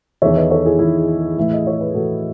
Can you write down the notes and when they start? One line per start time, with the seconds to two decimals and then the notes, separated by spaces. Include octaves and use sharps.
0.22 E2 D#3 C#5 E5
0.36 B4 D#5
0.51 A4 C#5
0.65 E4 G#4
0.79 E2 D#3 E4 G#4
1.37 A2 E3 E5
1.53 D#5
1.67 C#5
1.81 B4
1.94 A2 E3 F#4 A4